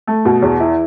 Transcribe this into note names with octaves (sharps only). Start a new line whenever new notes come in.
A3
B2
E2
E4